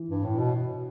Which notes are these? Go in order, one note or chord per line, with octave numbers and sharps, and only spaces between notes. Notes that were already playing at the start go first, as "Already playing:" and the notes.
Already playing: E3
G2
A2
B2